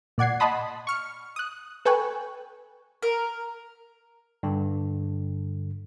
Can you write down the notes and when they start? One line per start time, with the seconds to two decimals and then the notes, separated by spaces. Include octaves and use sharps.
0.18 A#2 D5 F#5 G#6 C7
0.40 D#5 F#5 A5 B5 C6 D#6
0.87 C#6 F6 C#7
1.36 D#6 F#6
1.85 A4 B4 G5 G#5 C#6 F#6
3.03 A#4
4.43 G2 D3